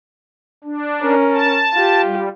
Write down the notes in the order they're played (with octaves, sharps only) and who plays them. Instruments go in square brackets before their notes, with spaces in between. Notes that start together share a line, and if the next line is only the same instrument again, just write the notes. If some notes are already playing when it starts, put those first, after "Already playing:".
[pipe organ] D4
[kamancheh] C#4 A#4
[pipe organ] A5
[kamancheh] F4 G4
[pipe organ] G3